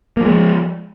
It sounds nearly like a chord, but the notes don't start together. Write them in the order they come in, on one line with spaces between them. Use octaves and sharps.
A#3 F3 G#3